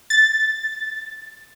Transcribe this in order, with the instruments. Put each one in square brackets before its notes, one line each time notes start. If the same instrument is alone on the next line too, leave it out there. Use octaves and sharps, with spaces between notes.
[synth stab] A6